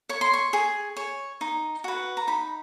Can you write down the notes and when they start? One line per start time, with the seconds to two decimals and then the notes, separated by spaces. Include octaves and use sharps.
0.09 C#5 C#6
0.21 C6
0.33 C#6
0.53 G#4
0.96 C#5
1.41 D#4
1.84 F#4 B4
2.17 A#5
2.27 D#4 B5